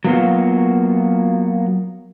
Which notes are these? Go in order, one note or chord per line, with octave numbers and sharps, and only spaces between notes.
F#3 A#3 B3 F4 F#4